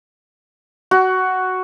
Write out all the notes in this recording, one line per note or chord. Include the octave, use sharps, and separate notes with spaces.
F#4